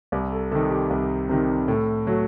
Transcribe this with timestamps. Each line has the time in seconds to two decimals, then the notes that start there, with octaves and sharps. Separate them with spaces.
0.12 C2 G4
0.32 A4
0.51 C3 A4
0.55 D#3
0.70 G4
0.90 C2
1.29 C3 D#3
1.68 A2 A4
2.07 F#3 A3